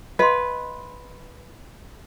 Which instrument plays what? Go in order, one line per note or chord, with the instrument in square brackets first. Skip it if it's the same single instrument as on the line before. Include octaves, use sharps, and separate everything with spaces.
[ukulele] B4 [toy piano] D#5 F5 C6